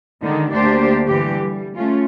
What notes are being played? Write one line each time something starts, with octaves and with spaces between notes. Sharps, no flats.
D3 D#3 G#3 D#4
D2 A#3 D4 G4 C5 D5
G2 D3 E3 G3 G4
G3
A3 C#4 F4